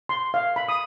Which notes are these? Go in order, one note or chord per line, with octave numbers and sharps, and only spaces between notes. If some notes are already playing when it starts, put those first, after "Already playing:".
C6
F5
B5
D#6